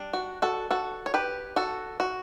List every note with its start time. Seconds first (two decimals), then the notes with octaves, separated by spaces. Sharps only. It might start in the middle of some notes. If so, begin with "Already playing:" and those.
Already playing: G3 D4
0.13 F#4
0.42 F#4 A4
0.71 F#4 A4
1.06 C#5
1.14 G4 B4
1.56 F#4 A4
2.00 F#4